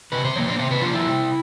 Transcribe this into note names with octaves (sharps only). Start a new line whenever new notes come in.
C3 B4
C5
F3 A#3 C#5
C5
C3 C5
B4
F3 A#3 F4
E4
C3